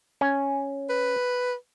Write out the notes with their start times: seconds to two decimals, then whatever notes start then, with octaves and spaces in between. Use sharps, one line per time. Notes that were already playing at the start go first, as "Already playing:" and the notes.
0.21 C#4
0.90 B4